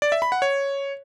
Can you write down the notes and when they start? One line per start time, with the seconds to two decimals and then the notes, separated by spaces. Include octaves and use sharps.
0.02 D5
0.12 E5
0.22 B5
0.32 F#5
0.42 C#5